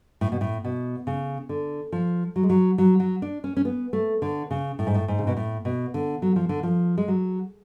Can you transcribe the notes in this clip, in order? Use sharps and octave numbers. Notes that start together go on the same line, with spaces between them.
A2
B2
A2
B2
C#3
D3
F3
F#3
G#3
F#3
F#3
F#3
D4
C#4
C#4
B3
A3
D3
C#3
A2
G#2
A2
G#2
C#3
B2
A2
B2
D3
F#3
F3
D3
F3
G#3
F#3